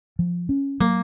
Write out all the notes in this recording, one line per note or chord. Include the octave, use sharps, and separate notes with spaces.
F3
C#4
F#3 A#3